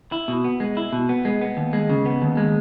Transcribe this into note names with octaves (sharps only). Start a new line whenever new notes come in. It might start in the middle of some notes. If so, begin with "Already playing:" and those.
E4
B2
B3
G#3
E4
B2
B3
G#3
B3
D#2
G#3
C#3
B3
D#2
G#3